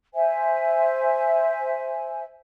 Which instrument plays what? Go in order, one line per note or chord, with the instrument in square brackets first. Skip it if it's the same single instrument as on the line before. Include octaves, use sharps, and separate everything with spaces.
[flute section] C5 E5 G#5